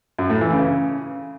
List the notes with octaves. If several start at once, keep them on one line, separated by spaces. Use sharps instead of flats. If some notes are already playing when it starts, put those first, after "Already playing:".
F#2
A2
E3
C#3